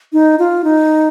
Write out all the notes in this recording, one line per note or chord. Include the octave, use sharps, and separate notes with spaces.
D#4
F4
D#4